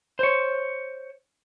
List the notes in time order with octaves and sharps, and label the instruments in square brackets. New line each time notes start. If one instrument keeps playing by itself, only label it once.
[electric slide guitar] C5 C#5